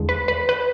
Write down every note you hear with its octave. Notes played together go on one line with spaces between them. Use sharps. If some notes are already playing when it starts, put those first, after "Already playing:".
Already playing: E2 D3 G#3
B4
B4
B4